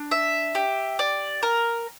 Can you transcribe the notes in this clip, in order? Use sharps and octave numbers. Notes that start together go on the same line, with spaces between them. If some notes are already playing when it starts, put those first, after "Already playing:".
Already playing: D4
E5
G4
D5
A#4